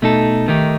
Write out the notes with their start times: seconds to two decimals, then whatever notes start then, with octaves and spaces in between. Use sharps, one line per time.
0.02 B2 A3 D#4 A4
0.48 D#3 A3 D#4 G4